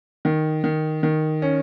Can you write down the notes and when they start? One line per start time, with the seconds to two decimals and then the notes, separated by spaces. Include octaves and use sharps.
0.25 D#3
0.64 D#3
1.03 D#3
1.42 C#4